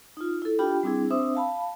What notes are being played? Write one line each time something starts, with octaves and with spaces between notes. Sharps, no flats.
D#4 F4
E4 A4
D4 F4 G4 G5 B5
G3 C4 D4 E4 G#4
C4 D4 C5 E5 D#6 E6
F5 A5 B5